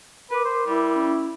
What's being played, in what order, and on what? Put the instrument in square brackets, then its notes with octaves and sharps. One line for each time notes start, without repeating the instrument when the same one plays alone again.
[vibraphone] A#4 D6 [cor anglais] B4
[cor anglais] C5
[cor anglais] G3 [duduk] E4
[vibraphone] C#4